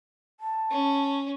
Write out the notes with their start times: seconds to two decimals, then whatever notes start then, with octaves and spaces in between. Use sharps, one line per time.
0.40 A5
0.71 C#4